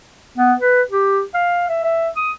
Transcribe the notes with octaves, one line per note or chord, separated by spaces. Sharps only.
B3
B4
G4
F5
E5
E5
D#6